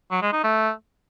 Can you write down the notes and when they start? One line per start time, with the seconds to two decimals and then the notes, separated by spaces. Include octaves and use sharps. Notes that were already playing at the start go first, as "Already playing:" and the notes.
0.11 F#3
0.22 G#3
0.33 D#4
0.44 A3